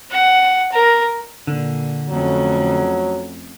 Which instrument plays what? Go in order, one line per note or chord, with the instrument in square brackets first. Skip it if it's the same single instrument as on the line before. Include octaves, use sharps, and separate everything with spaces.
[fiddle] F#5
A#4
[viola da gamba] A#2 [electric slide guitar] D3
[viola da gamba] F2 A3 C#4 [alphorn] F#3